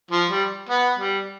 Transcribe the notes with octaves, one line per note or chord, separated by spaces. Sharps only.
F3
G3
B3
G3